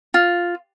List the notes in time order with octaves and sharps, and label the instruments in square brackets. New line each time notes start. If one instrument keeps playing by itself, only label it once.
[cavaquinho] F4